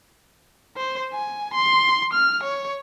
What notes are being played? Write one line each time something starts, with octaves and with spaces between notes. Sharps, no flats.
C5
G#5
C6
F6
C#5